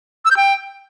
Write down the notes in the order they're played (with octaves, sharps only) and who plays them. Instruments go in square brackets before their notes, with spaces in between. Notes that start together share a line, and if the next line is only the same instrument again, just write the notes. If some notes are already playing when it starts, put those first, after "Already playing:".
[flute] E6
G6
G5